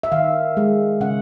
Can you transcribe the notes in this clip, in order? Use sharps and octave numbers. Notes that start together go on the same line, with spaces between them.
E5
D#3 F5
G#3
C#3 F#5